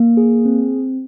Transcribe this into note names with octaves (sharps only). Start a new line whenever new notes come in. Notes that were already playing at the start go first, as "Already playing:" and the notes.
Already playing: A#3
G#4
C4